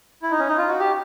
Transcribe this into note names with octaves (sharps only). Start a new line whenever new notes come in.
E4
D#4
C#4
D#4
F4
F#4
G4